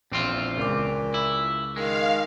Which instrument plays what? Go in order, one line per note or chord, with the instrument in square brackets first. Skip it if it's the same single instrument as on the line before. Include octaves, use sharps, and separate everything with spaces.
[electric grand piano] A#1 [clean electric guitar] E2 C4 F4
[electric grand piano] C#2 D6 [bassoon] A#2
[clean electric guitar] E4
[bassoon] D#3 [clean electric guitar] G#3 [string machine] F5